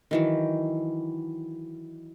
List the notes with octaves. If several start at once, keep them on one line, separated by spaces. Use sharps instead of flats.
D#3 E3 F#3